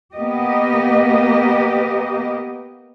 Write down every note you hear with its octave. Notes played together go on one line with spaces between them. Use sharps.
A#3 B3 G4 D#5